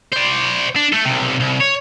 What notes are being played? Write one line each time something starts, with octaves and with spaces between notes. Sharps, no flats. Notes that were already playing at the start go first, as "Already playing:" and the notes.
C5 D5
D4
A3 A4
B1 C3
C2
C#5